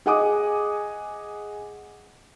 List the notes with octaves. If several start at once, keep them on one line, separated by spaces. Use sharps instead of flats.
G#4 D#5 F#5 G#5 D6 D#6